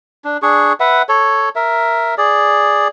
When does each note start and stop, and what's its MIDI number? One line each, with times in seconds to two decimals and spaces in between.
0.25 0.37 62
0.42 0.73 62
0.42 0.73 68
0.42 0.73 85
0.80 1.02 71
0.80 1.02 76
0.80 1.02 78
1.09 1.49 69
1.09 1.49 73
1.56 2.15 70
1.56 2.15 76
2.18 2.88 68
2.18 2.88 74